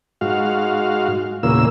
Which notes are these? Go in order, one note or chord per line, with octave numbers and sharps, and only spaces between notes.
G#2 F#4 F5
E2 A#2 C#3 A#3 E6